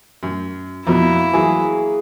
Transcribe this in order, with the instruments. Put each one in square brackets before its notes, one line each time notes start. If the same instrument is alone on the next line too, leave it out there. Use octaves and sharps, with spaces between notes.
[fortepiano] F#2
[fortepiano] F2 B2 [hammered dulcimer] A#3 [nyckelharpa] E4
[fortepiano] E3 F#3 [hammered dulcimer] G#4